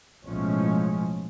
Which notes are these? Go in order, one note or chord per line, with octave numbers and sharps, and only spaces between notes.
B1 A2 F3 G#3 C#4